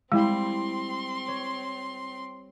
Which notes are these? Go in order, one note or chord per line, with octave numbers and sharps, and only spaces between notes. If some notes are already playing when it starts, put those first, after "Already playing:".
G3 G#3 C4 E4 G5 C6
C#5